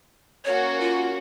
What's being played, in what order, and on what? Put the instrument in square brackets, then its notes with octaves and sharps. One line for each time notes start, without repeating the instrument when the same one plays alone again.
[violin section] A#3 C#4 F#4 [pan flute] C#5
[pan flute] F4